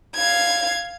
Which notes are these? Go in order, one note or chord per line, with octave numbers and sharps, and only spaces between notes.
F5 G#6